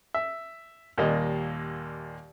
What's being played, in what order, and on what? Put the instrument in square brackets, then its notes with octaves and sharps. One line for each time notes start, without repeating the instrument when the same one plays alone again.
[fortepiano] E5
D#2 A#2 G3 A#3 D#5